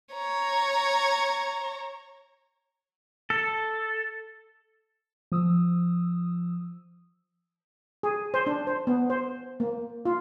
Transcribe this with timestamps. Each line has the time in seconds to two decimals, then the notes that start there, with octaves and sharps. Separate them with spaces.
0.14 C#5 A#5
3.30 A4
5.32 F3 D#6 E6
8.03 G#4
8.34 C5
8.47 D4
8.67 C5
8.87 B3
9.10 C5
9.60 A#3
10.05 F4